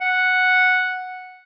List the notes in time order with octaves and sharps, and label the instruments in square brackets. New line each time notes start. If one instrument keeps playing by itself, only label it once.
[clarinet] F#5